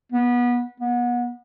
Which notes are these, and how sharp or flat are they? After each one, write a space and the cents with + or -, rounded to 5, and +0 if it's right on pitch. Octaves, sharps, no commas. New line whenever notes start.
B3 -20
B3 -30